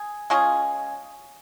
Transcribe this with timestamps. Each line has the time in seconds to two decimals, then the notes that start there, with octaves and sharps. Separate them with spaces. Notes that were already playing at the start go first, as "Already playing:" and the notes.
Already playing: G#4
0.30 G#3 C#4 F4 G#4